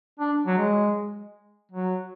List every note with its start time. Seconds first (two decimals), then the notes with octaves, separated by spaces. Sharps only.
0.20 D4
0.47 F#3
0.58 G#3
1.71 F#3